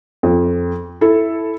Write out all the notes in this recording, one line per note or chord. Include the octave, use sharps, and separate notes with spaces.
F2
E4 A4